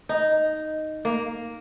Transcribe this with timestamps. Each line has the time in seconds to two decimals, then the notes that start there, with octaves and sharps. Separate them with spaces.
0.09 D#4
1.05 A#3